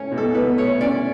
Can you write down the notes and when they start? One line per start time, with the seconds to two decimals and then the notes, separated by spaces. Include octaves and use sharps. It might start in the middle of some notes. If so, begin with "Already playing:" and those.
Already playing: A3 C#4 C#5
0.12 B2
0.17 A4
0.35 B2 B4
0.58 A3 C#5
0.81 C#4 D5